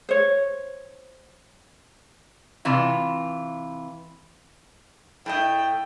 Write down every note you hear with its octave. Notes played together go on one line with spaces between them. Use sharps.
C5 C#5
C3 E3 F4
A2 A3 D#5 G5